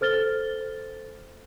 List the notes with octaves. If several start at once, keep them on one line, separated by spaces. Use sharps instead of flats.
A4 C5 F6 A6 G7